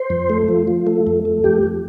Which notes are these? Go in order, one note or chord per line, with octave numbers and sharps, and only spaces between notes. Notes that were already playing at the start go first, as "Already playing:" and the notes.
Already playing: C5
F2
A3
F3
F3
A3
F2
A3
F2 G4
F2